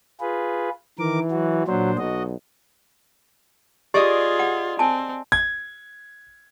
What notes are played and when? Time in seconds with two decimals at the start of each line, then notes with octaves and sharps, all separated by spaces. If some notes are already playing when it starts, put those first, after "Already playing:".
0.20 F4 G#4 B4
0.99 D#3 E3 A#4 D6
1.31 F#3 F#4
1.68 A#2 F#3 D4 C5
1.98 B1 F#4 D#5
3.94 F4 G4 G#4 D5 D#5
4.39 F#5
4.79 C4 G#5 A5
5.32 G#6